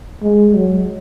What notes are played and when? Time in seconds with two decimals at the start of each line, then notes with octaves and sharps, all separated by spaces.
0.23 G#3
0.55 F#3